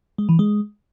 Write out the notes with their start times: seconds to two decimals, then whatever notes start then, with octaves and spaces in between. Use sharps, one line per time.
0.18 G#3
0.29 E3
0.39 G#3